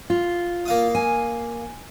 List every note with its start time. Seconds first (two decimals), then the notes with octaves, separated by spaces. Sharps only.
0.10 F4
0.66 A#3 F5 D#6
0.95 G#5